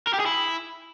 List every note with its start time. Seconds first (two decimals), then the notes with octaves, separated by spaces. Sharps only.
0.07 A#4
0.14 G4
0.20 G#4
0.26 E4